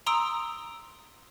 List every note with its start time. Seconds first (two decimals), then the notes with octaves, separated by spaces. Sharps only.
0.06 A#5 C6 D#6 E6 D7 F7